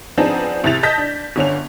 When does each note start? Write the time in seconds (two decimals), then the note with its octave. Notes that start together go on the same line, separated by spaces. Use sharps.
0.17 F3 B3 C4 D4 D#4 G#4
0.64 C2 C3 E4 A6 F7
0.83 D#5 A5 G6 A#6 B6
0.98 D4
1.36 G1 D3 C#4 F7